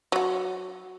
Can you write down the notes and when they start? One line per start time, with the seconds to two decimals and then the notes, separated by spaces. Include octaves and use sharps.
0.12 F#3 F#4